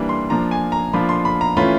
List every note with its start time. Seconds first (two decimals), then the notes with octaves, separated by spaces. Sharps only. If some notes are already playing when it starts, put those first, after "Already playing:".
Already playing: E3 G3 A#3 D4
0.09 C6
0.30 F3 A#3 D4 F4 A#5
0.51 G#5
0.72 A#5
0.93 F3 A#3 D4 F4 B5
1.09 C6
1.25 B5
1.41 A#5
1.57 E3 A3 C#4 F4 B5